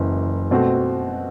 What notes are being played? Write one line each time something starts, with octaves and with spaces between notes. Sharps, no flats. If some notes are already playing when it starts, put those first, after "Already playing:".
Already playing: F#1 F#2 E3
B2 A3 C4 F#4